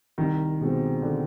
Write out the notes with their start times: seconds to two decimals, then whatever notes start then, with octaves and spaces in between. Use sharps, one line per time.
0.18 C2 D#3
0.60 B2 G#3 C4
1.02 D3